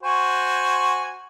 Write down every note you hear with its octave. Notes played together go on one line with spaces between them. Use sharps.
F#4 C5 G#5